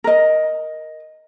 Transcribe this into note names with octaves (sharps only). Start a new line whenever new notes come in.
A#4 D#5